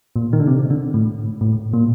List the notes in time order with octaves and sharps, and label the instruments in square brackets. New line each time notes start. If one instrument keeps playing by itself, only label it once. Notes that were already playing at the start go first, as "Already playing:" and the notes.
[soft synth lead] A#2
D#3
D3
C3
D3
A2
A2
A#2